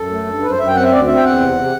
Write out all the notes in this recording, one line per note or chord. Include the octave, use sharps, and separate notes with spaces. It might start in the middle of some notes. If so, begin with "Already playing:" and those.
Already playing: F#2 A4
A3
G2
F#2 B4
C5
F#2 E5
G5
C4 F#5
E5
D2 D5
C4 E5
G5
E2 F#5
C3
C3